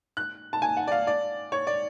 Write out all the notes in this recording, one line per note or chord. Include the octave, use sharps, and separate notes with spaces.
F#6
A5
G#5
F#5
D5
F5
D5
C#5
D5